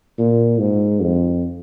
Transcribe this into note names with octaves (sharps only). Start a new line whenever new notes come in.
A#2
G#2
F2